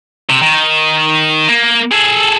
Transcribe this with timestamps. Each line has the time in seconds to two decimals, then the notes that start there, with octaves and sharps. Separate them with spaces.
0.29 C3
0.42 D#3
1.49 A#3
1.91 G#4 A4